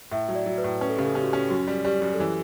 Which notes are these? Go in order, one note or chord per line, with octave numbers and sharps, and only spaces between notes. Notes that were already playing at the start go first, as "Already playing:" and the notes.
A2 E5
F#3
D5
F#3
B4
A2
C#4 B4
A4
C#3 G4
A4
C#4 G4
F#4
G4
C#4
F#2 F#4
G3
G3 G4
F#2
A4
E3 G4